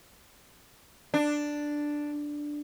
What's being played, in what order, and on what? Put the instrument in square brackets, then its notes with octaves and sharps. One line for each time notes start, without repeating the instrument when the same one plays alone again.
[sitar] D4